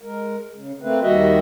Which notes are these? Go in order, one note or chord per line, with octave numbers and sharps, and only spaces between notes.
G#3 A#4
C#3
A3 A#3 C4 B4
D#2 D#3 G3 F#4 D#5 E5